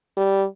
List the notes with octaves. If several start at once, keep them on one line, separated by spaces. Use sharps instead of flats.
G3